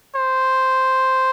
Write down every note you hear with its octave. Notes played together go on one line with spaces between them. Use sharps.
C5